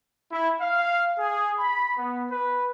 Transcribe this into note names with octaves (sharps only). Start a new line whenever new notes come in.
E4
F5
G#4
B5
B3
B4